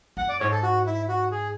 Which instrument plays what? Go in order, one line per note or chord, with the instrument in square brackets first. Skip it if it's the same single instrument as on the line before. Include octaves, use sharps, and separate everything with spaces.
[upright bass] F#2 [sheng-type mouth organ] F#5
[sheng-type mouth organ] D5
[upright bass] G#2 [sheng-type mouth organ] C#5
[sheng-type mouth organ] A4
F#4
E4
F#4
G#4